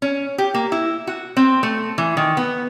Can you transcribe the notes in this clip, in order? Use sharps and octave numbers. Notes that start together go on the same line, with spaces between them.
C#4
G4
A#3
E4
F#4
C4
A3
E3
D#3
B3